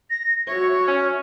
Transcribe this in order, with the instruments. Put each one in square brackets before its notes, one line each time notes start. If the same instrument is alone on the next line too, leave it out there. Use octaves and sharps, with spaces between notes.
[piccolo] A#6
[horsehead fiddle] F#4 C#5 [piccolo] E5
[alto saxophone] C#4